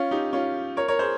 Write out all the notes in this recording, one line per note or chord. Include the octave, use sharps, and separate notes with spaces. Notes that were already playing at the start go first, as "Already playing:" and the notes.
Already playing: C#4 F4
D#4 G4
C#4 F4
A#4 C#5
A#4 C#5
G#4 C5